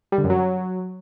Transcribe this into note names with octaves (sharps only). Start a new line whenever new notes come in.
G3
D3
F#2
F#3